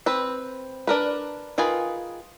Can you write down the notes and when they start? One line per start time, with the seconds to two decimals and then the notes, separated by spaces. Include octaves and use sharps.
0.06 C4 B4
0.87 D4 A#4 B4
1.58 D#3 F4 G#4 B4 G#5